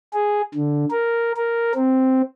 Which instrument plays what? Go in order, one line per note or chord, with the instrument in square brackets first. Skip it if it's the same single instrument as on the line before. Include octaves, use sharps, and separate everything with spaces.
[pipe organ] G#4
D3
A#4
A#4
C4